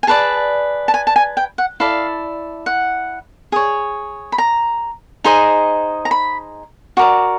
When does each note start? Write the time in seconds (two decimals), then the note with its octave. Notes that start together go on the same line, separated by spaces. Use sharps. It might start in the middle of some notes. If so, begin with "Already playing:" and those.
0.03 G#5
0.07 G#4 B4 D5 A5
0.88 A5
0.94 G#5
1.07 A5
1.16 G#5
1.37 G5
1.58 F#5
1.80 E4 A4 D5 F5
2.66 F#5
3.52 G#4 C#5
4.32 B5
4.38 A#5
5.24 D#4 G#4 C5 D#5
6.05 A#5
6.11 B5
6.97 F#4 A#4 D5 D6